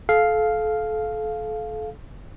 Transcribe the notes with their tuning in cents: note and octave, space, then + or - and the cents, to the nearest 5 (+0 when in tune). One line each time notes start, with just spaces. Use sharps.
A4 -30 F5 +0